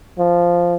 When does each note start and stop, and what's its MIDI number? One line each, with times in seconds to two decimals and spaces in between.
0.19 0.76 53